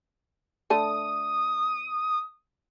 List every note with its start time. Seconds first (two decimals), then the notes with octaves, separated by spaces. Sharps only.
0.70 D3 A3 A5 D#6